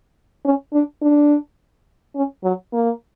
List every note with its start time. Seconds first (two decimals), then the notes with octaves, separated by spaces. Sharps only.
0.45 C#4
0.73 D4
1.02 D4
2.15 C#4
2.43 F#3
2.73 A#3